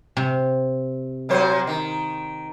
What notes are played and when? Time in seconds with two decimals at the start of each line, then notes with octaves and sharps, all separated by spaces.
0.17 C3
1.29 A#2 F#3 C5
1.67 D#3